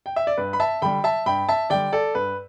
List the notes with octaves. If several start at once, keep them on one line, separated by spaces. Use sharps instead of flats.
G5
E5
D5
G2 B4
B5
E5 A5
D3 G3 G5 B5
E5 A5
G2 G5 B5
E5 A5
D3 G3 D5 G5
A4 D5
G2 B4